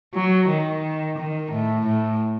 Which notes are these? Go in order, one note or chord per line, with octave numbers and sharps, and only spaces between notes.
F#3
D#3
D#3
A2
A2